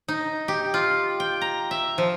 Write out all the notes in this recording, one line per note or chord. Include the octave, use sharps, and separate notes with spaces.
D#4
G4
F4
G5
A#5
E5
F3